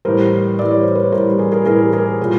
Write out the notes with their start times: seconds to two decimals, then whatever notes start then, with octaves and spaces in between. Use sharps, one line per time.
0.05 A2 E3 G3 A#4 C5
0.59 A2 E3 G3 D5
0.71 C#5
0.83 C5
0.95 B4 C#5
1.12 A2 E3 G3 A#4 C5
1.39 G#4 A#4
1.52 G#4 A#4
1.65 A2 E3 G3 G#4 A#4
1.93 G#4 A#4
2.22 A#2 G3